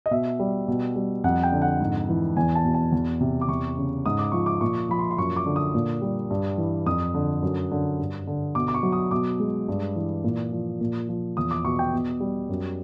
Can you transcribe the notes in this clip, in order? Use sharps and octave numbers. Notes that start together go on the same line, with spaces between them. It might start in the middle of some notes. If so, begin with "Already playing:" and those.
D#5
B2 E5
G3
B2
G3
F2 F#5
G5
D3
F#5
G#2
E3
E2 G#5
A5
B2
A5
E2
C3
D6
E2 C#6
C#3
G#2 D#6
D6
F3 C#6
D6
A#2 C#6
F3 B5
C6
C6
F#2 C#6
D6
D3
D#6
A#2
G3
G2
E3
F2 D#6
D3
F#2
D3
G2
D3
B2 D6
D6
C#6
F#3
D#6
B2 D6
G#3
G2
E3
A#2
F3
A#2
F3
E2 D#6
D6
B2 C#6
G5
B2
G3
F#2